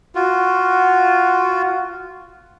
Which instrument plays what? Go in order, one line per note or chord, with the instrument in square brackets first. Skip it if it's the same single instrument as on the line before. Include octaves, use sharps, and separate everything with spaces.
[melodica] F4 F#4